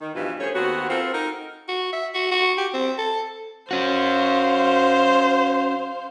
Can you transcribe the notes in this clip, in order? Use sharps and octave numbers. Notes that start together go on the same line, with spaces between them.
D#3
G2 B2 E3 F3 F4
A3 C#4 G#4 C5 C#5
D#2 B3 C4 F#4
C4 F4 A4 A#4 C5
D#4 F#4 A#4
F#4
E5
F#4
F#4
G4
C4
A4
C#4 F#4 C5 F5